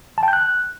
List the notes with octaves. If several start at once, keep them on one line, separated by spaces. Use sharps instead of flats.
A5
G5
G6
F#6